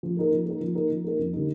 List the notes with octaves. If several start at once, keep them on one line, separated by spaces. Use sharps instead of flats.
F3
A#3 D#4 A#4
F3
A#3 D#4 A#4
F3
A#3 D#4 A#4
F3
A#3 D#4 A#4
F2
D3 G3 A#3 D#4